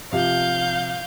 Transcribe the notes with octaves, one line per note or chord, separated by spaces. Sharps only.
C3 F3 G4 F5 G6